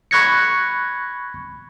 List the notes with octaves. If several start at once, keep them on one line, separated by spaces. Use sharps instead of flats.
B5 C#6 F#6 G#6 A#6 C#7